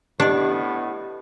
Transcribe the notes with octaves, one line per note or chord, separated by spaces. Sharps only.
A2 B3 D4 G4 D#5